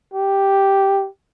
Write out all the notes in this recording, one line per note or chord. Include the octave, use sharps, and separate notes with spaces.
G4